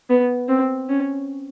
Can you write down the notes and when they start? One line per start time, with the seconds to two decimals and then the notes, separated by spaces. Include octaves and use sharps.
0.10 B3
0.49 C4
0.89 C#4